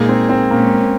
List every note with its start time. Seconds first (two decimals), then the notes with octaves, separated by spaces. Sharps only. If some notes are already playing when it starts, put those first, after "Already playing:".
Already playing: A#2 G#3 A#3 D#4 G#4
0.09 C4
0.29 C4
0.50 A#2 G#3 A#3 C#4